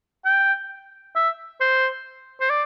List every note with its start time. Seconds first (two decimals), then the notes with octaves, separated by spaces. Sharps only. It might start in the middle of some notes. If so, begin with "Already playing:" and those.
0.25 G5
1.16 E5
1.61 C5
2.40 C5
2.49 D5